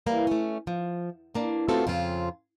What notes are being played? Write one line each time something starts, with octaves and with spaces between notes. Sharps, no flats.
E3 G3 A#3
A3 C#4
F3
E2 A#3 D4
A3 B3 C4 F4 F#4 A4
F2 C#3 C4 F4